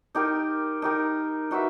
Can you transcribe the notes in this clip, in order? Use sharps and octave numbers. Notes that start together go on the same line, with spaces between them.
D#4 G4 A#4
D#4 G4 A#4
D#4 F#4 B4 E5